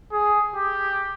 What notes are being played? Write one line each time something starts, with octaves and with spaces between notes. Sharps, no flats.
G#4
G4